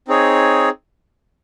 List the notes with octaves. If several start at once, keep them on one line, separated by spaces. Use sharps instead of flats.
C4 D#4 G#4 C#5